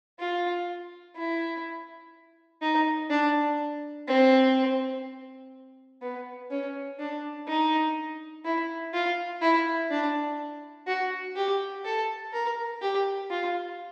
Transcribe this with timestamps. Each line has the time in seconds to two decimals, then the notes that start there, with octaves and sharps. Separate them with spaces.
0.19 F4
1.16 E4
2.62 D#4
3.10 D4
4.07 C4
6.02 B3
6.50 C#4
6.99 D4
7.48 D#4
8.45 E4
8.93 F4
9.41 E4
9.90 D4
10.87 F#4
11.36 G4
11.85 A4
12.33 A#4
12.82 G4
13.30 F4